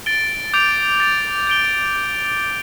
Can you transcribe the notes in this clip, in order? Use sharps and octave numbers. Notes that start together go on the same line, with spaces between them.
A6 D7 G7
D6 G6 D7 F7
A6 D7 F7
G6 D7 G7